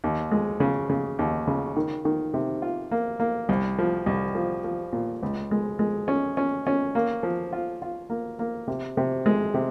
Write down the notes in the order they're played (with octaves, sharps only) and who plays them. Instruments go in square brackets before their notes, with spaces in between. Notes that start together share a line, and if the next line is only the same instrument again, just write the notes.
[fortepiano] D#2
G#3
C#3
C#3
D#2
C#3
D#3
D#3
C3
F4
A#3
A#3
C2
F3
C2
F3
F3
A#2
C#2
G#3
G#3
C#4
C#4
C#4
A#3
F3
F4
F4
A#3
A#3
C3
C3
G#3
C3